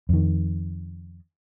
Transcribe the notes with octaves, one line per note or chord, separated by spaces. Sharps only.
F2 D#3